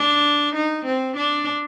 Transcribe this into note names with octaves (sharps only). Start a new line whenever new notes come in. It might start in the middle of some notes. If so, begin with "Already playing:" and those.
Already playing: D4
D#4
C4
D4